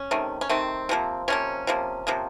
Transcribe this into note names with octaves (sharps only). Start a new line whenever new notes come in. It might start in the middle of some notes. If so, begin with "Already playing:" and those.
Already playing: C#4
C3 D#3 A3
C#4
C3 D#3 A3 C4
C3 F3 A#3
C3 F3 A#3 C#4
C3 F3 A#3
C3 F3 A#3